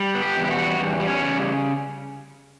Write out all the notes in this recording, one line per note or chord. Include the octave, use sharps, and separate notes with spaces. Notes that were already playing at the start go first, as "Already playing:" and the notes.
Already playing: G3
B3
G4
E2
G4
F#4
G3
E2
G3
C#4
C#3